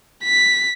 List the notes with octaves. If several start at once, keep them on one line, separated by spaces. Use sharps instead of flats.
B6